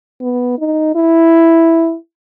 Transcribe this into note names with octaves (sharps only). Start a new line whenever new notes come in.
B3
D#4
E4